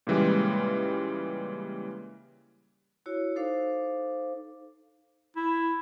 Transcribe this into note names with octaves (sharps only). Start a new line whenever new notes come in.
A#2 C#3 E3 G3 G#3
E4 F#4 C#5
D#4 A4 C5 F5 D6
E4